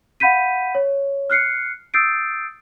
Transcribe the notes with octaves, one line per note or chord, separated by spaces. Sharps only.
F5 F#5 B5 G6 B6 D#7
C#5
F6 F#6 C7 C#7
D#6 E6 G6 A6 C7 D7